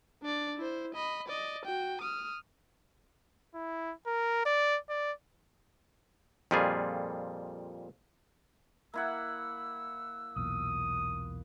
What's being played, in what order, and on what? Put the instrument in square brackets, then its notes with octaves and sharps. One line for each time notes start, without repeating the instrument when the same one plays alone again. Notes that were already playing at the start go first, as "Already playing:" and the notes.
[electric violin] D4 D5
E4 C5
D#5 B5
D5 D#5
F#4 G5
D#6 F6
[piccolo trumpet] E4
A#4
D5
D5
[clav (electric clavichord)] F2 A#2 G3 F4 G#4
[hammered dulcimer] A#3 E4 F#5 [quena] E6
[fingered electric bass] B1 E2 A#2 [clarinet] D#6